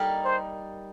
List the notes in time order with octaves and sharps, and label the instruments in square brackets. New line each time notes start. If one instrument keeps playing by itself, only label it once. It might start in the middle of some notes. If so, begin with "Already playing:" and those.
Already playing: [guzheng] G3 A#3 D#4 G4 A#4
[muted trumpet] C5